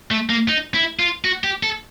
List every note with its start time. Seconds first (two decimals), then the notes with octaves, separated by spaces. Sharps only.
0.11 A3
0.30 A#3
0.49 D#4
0.74 E4
0.99 F4
1.25 F#4
1.44 G4
1.63 A4